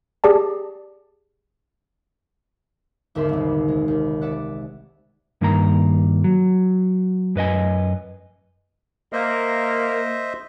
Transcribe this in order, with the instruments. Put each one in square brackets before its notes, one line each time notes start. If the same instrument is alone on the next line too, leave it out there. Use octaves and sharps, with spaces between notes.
[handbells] G4 G#4 D5 A5
[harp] G#1 D#2 D3 E5 C6
D#1 C2
G#3
D#2
D5 E5 F#5 F#6
[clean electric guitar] G2 D#3 A#3 A#5
F#3
F#2 B4 D#5 G#5
[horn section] A#3 [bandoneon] C5 D#5 E5